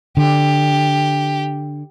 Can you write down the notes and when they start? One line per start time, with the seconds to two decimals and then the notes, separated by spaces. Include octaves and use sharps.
0.17 D3 G4